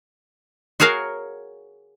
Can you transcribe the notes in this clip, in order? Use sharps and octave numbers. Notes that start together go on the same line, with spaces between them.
F#4 G#4 A#4 C#5 F5